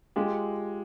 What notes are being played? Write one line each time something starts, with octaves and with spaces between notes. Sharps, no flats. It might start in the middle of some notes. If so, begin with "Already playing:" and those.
G#3 F4 G4